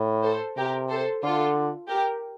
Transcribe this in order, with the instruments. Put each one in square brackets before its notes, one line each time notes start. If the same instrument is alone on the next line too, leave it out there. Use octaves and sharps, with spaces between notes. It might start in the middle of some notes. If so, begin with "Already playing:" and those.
Already playing: [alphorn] A2
[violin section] A4 C5
[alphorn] C3 [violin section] G4 A#4
[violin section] A4 C5
[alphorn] D3 [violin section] F4 A4
[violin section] G4 A#4